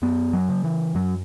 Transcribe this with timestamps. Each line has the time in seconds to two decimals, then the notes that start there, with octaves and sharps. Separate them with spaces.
0.02 F#2 B3
0.33 F#3
0.49 C#3
0.64 E3
0.95 F#2 F#3